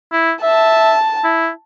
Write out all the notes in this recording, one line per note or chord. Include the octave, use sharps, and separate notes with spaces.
E4
E5 A5
E4